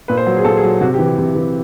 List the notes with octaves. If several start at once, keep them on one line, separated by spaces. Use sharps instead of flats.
A#2 B4
C5
F#3
G#4
A#2 A4
G#4
F#3
C3 F#4
G4
E3
G4
C3
E3